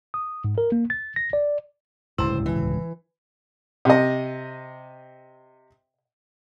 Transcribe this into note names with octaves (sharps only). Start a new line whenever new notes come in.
D#6
G#2
A#4
A#3
A6
A#6
D5
D1 C#2 G2 E4 C5
E3
C3 D#5